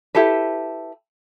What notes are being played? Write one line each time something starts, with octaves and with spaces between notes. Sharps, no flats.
E4 G4 A4 B4